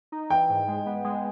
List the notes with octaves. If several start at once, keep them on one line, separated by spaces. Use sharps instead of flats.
D#4
E3 G5
G#2
G#3
B3
G#3